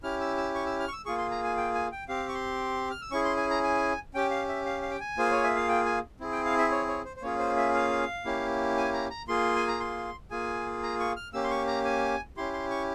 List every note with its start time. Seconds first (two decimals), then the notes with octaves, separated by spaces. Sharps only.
0.03 C#4 E4 G4 F6
0.20 E6
0.37 E6
0.55 C#6
0.67 E6
0.80 F6
0.88 C#6
0.93 E6
1.05 A#3 F4 G#4 C#6
1.18 C6
1.31 A#5
1.44 G#5
1.57 G5
1.74 G#5
1.92 G5
2.08 C4 G4 F5
2.29 C#6
2.34 C6
2.91 F6
3.01 E6
3.11 C#4 E4 G#4 C#6
3.25 C6
3.37 G#5
3.50 A#5
3.63 G#5
4.14 C#4 G4 G5
4.31 F5
4.48 E5
4.66 F5
4.82 F5
4.91 G5
5.00 G#5
5.17 A#3 F4 G#4 C5
5.31 C#5
5.43 E5
5.56 F5
5.68 G5
5.86 G#5
6.20 C4 E4 G#4
6.32 G5
6.45 F5
6.58 E5
6.71 C#5
6.88 C#5
7.05 C5
7.16 C5
7.22 A#3 C#4 F4 G#4 C#5
7.39 C5
7.57 E5
7.74 F5
8.25 A#3 C#4 E4 G4
8.77 G#5
8.93 A#5
9.10 A#5
9.28 A#3 F4 G#4 C6
9.56 G#5
9.68 A#5
9.80 C6
10.31 A#3 F4 G#4 G#5
10.83 A#5
11.00 C#6
11.16 F6
11.33 A#3 C#4 G4 E6
11.44 C6
11.50 C#6
11.67 A#5
11.85 G#5
12.37 C#4 E4 G4 C6
12.53 C6
12.70 C#6